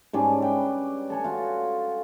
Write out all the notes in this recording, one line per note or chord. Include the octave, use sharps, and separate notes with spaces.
G#2 G3 C#4 D4
B4 G5
A4 C#5 G#5
F4 F#4